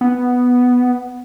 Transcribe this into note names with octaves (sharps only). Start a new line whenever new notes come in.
B3